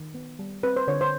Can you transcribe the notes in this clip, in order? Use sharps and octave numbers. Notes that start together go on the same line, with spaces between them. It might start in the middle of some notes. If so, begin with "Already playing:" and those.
Already playing: D#3
B3
G3
C4 B4
C5
D3 C#5
C5